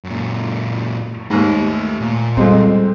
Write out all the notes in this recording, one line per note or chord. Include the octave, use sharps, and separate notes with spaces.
F#2 A#2
D#2 G#2 A3 G#5
A#2
F2 G3 G#3 C4